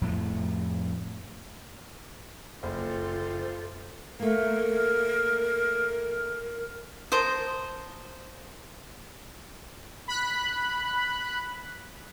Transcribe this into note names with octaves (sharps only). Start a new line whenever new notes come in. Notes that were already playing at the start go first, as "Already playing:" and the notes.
F2 A2 A3
F#1 F4 A4 C5
A3 A#3 A#4
A#4 C5 A5 D#6
B5 F#6